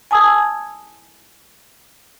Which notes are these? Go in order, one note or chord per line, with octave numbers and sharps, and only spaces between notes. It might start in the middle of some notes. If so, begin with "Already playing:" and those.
G#5 A5 D#6 E6 G#6